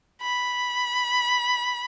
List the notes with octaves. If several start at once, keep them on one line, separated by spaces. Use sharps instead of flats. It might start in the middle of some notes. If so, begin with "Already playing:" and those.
B5